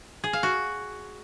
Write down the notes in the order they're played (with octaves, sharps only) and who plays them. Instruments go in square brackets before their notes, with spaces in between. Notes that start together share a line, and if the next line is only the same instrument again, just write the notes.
[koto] G#4
F5
F#4